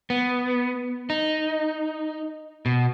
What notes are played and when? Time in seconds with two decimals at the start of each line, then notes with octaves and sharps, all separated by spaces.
0.10 B3
1.10 D#4
2.66 B2